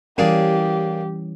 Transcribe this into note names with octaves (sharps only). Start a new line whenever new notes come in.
E3 G3 A#3 C#4 D4 G4 G#4